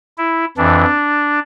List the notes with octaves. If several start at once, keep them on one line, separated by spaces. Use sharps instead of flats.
E4
F2 E3 D4